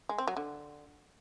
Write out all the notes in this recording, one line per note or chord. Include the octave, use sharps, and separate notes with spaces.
G#3
C4
F#3
D3